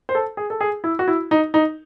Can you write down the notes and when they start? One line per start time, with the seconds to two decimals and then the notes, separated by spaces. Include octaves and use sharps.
0.09 C5
0.15 A4
0.37 G#4
0.50 A4
0.61 G#4
0.84 E4
0.99 F#4
1.08 E4
1.31 D#4
1.54 D#4